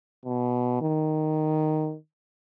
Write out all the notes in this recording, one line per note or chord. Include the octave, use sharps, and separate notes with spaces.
B2
D#3